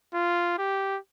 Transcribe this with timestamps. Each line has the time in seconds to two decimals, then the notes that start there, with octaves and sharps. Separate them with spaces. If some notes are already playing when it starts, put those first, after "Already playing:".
0.14 F4
0.58 G4